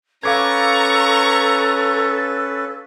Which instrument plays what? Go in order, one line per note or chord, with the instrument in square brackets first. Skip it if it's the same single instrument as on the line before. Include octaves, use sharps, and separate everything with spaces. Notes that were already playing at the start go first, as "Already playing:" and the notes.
[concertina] C#4 B4 [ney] A4 [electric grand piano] F5 D6 G#6 [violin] A#5 C#6